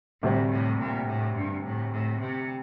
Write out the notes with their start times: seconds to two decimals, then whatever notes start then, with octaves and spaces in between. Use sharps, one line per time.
0.23 D2 A2 C3 G3 C4
0.51 A2
0.79 A#2
1.07 A2
1.35 G2
1.65 A2
1.93 A2
2.20 C3